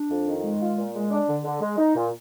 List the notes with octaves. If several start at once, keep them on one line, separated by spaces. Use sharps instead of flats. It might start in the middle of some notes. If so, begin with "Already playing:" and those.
Already playing: D4
F2
D#3
G#3
F4
A#2
G#3
D4
D3
D3
G#3
D#4
A#2